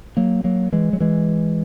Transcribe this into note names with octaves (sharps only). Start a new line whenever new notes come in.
F#3 A#3
F#3 A#3
E3 G#3
F#3
E3 G#3